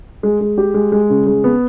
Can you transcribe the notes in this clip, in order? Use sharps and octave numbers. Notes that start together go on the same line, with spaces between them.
G#3
G#3
G4
G#3
G#3
C#3
G#3
B3